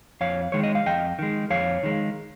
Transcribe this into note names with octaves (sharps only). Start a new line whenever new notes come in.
F2 C#5 F5
D#3 G#3 C#5
D#5
F5
F2 D#5 G5
D#3 G#3
F2 C#5 F5
D#3 G#3